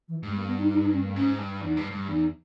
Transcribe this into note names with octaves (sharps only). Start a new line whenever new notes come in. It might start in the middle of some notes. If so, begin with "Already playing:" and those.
E3
G2 G#3
A#3
B3
D#4
D#4
D#4
C#4
A#3
G#2 C#4
G2
E2 D#4
G2
G2
E2 D#4